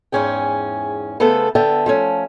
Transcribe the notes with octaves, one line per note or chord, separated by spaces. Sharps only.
E2 G#2 C#4 G#4 G5
C#3 A3 B3 A4 B4 C5
D3 B3 E5 G5 A5
F3 A3 C#4